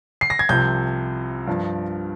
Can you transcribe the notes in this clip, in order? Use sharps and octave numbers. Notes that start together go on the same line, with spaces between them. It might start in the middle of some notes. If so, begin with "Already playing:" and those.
C7
A#6
G#6
C2 C3 F3 G6
G2 F3